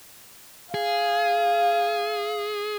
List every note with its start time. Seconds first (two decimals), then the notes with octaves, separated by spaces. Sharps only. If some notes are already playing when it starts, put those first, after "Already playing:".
0.74 G#4 F5